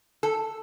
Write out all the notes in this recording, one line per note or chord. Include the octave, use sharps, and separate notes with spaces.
A4